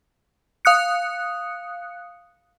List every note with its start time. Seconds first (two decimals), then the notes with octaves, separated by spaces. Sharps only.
0.65 F5 D#6 F#6 C#7